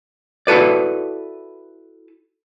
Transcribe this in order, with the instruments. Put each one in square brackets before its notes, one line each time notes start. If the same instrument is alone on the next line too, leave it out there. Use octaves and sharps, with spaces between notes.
[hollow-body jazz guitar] E4 F#4 A4 B4 D5